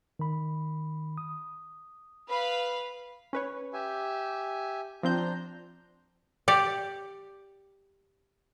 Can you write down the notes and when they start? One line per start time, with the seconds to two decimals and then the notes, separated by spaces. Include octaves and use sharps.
0.19 D#3 B5
1.18 D#6
2.29 B4 F5 B5
3.33 C#4 B4 C#5
3.73 G4 E5 G#5
5.03 F3 C4 D4 C5 A#5 G6
6.48 G4 D5